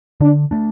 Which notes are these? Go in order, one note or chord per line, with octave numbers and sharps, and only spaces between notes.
D3 D4
A3 D4